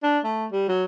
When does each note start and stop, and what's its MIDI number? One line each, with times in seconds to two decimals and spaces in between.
0.03 0.19 62
0.24 0.46 57
0.52 0.68 55
0.68 0.85 54